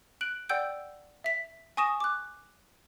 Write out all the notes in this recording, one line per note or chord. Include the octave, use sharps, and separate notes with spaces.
F#6 D7 F#7
D5 F#5 G5 E6 G6 D7
E5 B6
G#5 C#6 D#6 A#6 E7
D6 F#6